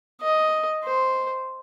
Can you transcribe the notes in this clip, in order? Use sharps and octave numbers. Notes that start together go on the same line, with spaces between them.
D#5
C5